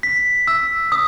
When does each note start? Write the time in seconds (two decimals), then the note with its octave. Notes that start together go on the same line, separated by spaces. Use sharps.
0.03 B6
0.47 E6
0.92 D#6